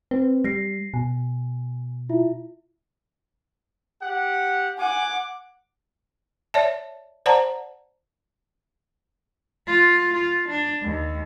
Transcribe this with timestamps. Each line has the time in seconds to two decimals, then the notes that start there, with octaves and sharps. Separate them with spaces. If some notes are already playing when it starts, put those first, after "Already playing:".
0.11 C4 B4
0.44 G3 A#6 C7
0.94 B2 G#5
2.09 E4 F4 E5
4.02 G4 F#5
4.78 F#5 G#5 D6
6.54 C#5 D5 E5 A5
7.26 C5 D5 F#5 A5 A#5
9.67 F4
10.13 F4
10.49 D4
10.83 D#2